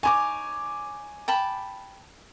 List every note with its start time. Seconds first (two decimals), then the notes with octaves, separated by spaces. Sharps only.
0.03 D#4 E4 C#5 G#5 D6
1.28 G5 A5 B5